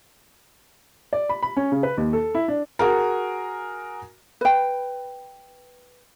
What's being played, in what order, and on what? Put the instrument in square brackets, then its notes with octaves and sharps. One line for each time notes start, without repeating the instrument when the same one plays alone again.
[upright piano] D5
B5
B5
C#4
C#3
B4
D#2
A4
E4
D4
[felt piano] F#4 G#4 A#4
[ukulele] B4 G5